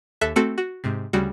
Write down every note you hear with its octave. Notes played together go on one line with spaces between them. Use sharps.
D#2 A4 E5 F#6
A3 C4 F#4 A4
F#4
G#2 C3
D2 C#3 G3 F#4